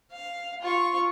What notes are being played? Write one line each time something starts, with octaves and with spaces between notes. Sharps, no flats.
F5
F4 C#6